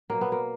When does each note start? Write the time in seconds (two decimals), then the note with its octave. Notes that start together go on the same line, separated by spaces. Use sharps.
0.10 B2 F#3 A#3
0.21 B3
0.32 A#3